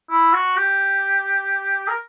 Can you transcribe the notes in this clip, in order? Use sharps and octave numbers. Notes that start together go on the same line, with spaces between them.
E4
F#4
G4
A#4